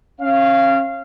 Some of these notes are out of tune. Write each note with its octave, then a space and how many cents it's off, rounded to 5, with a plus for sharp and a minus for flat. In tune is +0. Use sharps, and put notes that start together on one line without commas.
C#4 -35 F5 -20